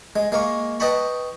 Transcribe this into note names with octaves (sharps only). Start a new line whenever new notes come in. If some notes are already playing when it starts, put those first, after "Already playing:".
G#3
G#3 A#3 F5 C#6
B4 D#5 G5 A5 B5 C#6